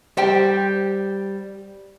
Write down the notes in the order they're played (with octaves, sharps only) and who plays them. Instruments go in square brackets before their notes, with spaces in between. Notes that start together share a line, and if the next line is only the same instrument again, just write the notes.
[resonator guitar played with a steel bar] G3 C5 G5